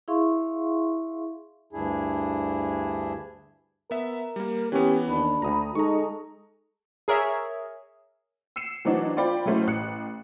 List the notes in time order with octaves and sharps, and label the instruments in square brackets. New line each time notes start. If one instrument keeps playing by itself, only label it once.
[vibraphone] E4 G#4 E5 F5 C6 C#6
[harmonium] D2 G2 D4 E4 G#4
[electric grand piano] B3 E5 [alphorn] A#4
[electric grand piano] G3 A#3
[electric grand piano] E3 B3 [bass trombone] C#4 [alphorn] G4
[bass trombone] D#2 [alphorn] D4 [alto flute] B5
[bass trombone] D2 [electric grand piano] A#5 D#6
[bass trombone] G#3 [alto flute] D#4 [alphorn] A4 [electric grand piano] A#5 C#6
[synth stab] G#4 A#4 C#5 E5
[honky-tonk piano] E6 C7 C#7 E7
E3 F#3 C4 D4 D#4 F#4
C4 F4 D5 G5 B5
F#3 G#3 A3 C#4 E4 C5
A1 F#6 C#7